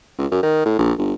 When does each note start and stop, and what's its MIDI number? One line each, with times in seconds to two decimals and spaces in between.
0.18 0.26 37
0.31 0.41 42
0.43 0.63 51
0.65 0.78 45
0.78 0.92 34
0.98 1.13 31